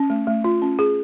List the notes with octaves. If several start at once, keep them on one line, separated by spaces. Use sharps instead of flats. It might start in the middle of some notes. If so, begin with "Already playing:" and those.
Already playing: C#4
A3
A3
F4
C#4
G#4